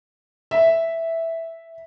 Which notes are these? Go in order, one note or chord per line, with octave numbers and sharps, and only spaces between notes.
E5